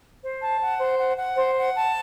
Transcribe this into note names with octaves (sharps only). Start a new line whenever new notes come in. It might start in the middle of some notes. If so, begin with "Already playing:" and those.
C5
A5
F#5
C5
F#5
F#5
C5
F#5
A5